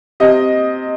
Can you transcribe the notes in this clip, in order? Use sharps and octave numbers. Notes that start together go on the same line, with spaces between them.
C3 D#5